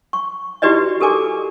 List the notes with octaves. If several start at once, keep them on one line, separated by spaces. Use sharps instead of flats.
C#6
E4 F#4 G4 B4 D5 D#5
G4 A4 A#4 G#5 D6